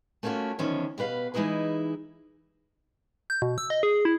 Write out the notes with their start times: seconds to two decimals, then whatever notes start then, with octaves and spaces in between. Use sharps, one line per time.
0.23 A3 A#3 C#4 D4 F4 F#4
0.59 E2 D3 D#3 F3 C#4 D4
0.98 B2 G4 B4 F5
1.34 E3 G#3 D#4 E4 G#4 B4
3.30 G6
3.42 B2
3.58 E6
3.70 D#5
3.83 G#4
4.05 E4